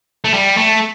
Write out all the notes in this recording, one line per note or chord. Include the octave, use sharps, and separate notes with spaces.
A3
G3
A3